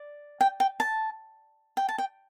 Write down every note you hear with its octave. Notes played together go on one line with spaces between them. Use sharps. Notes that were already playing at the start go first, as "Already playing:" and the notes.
Already playing: D5
G5
G5
A5
G5
A5
G5